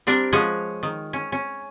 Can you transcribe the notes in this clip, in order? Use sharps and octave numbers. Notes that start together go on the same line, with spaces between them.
G3 C4 D4 A#4
F3 G#3 C#4 C#5 F#5 G#5
D#3
C#4
C#4